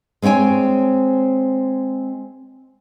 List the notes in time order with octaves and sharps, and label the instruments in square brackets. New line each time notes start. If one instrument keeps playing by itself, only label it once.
[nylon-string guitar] G#3 C4 C#5 G5 G#5